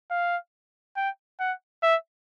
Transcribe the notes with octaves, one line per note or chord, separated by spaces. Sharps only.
F5
G5
F#5
E5